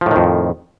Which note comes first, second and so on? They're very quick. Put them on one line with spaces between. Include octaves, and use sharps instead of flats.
F3 A2 D#3 F2